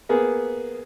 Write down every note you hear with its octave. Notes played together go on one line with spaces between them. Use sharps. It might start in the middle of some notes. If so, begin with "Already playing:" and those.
A#3 B3 G#4